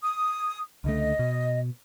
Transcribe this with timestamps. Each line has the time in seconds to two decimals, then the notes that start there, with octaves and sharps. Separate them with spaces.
0.02 D#6
0.84 C#2 D3 A3 D#5
1.19 B2